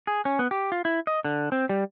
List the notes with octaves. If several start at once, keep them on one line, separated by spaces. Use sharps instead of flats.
G#4
C#4
B3
G4
F4
E4
D#5
D3
C4
G3